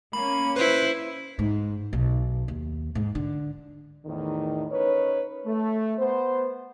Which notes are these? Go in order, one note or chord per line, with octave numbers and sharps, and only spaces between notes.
A#3 C#4 B5
E4 B4 C5
G#2
B1
D#2
G#2
D3
E2 A2 D#3
C#4 D#4 A#4 B4 C#5
A3
B3 C5